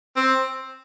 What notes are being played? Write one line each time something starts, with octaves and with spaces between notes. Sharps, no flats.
C4